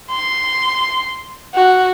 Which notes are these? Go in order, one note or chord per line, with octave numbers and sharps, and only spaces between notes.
C6
F#4